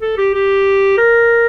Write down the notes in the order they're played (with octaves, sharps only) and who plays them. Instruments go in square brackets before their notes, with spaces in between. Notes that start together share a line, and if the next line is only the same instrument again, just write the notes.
[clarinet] A4
G4
G4
A#4